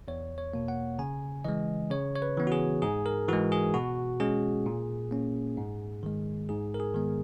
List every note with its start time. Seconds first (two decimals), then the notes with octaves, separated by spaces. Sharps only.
0.08 E2 C#5
0.38 C#5
0.54 B2 A#3
0.68 F#5
0.99 C#3 G#5
1.45 E3 G#3 D#5
1.90 C#3 C#5
2.15 C#5
2.22 B4
2.37 E3 B3
2.47 F#4
2.52 G#4
2.82 G#2 G#4
3.06 A#4
3.28 E3 G#3 F#4
3.52 G#4
3.74 B2 F#4
4.20 G#3 C#4 G#4
4.66 A#2
5.11 A#3 C#4
5.57 G#2
6.03 D#3 G#3
6.49 G#2 G#4
6.74 A#4
6.80 G#4
6.94 D#3 G#3 B3